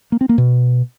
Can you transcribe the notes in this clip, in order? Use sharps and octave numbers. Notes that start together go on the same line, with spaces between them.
A#3
C4
A#3
B2